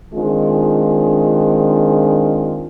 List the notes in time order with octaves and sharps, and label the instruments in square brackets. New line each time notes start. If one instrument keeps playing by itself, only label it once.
[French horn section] D#3 G#3 C4 D4 F4